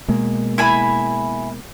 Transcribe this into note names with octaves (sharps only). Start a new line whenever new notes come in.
B2 G#3 A#3
E4 G#5 B5